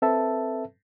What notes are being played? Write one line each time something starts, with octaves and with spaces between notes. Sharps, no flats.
C4 A4 B4 E5 A5